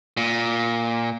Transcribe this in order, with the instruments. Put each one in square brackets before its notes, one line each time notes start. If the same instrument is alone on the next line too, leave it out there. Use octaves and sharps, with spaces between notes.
[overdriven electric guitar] A#2